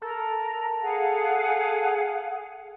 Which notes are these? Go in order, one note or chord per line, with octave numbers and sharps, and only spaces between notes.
A4 A#4 A#5
G#4 F5 F#5